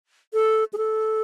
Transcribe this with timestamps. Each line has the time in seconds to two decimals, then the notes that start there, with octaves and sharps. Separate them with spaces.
0.33 A4
0.73 G#4
0.77 A4